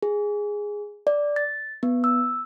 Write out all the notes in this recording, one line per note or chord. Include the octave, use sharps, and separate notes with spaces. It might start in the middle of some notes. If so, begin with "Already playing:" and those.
G#4
D5
A6
B3
E6